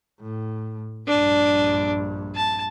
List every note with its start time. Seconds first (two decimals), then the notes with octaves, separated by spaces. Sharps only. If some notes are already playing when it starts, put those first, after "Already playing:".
0.21 A2
1.07 A#1 G2 D4
2.36 A5